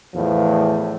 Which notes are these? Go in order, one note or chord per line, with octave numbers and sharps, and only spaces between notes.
E2 A2 F3